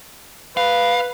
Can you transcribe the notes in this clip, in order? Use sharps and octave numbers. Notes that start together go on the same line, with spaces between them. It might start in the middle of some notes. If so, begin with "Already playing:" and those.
B4 F5